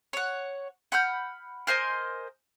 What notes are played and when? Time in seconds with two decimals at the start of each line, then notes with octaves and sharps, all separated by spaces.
0.13 C#5 F#5
0.92 F#5 B5 F6 G6
1.67 A#4 C5 D#5 G#5